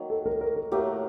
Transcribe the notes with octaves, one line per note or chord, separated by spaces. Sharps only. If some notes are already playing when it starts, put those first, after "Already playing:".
Already playing: D#3 F#3 A#3
A4
A#4
A#4
A#4
A2 F#3 A#3 G4